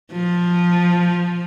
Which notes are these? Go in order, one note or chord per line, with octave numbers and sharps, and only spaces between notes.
F3